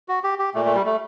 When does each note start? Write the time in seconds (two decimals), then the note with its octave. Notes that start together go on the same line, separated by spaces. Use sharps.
0.09 F#4
0.24 G4
0.39 G4
0.54 A#2 A3
0.66 A3
0.75 G3
0.86 A3